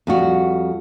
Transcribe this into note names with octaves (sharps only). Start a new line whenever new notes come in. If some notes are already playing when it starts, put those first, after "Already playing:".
F2 G3 F#4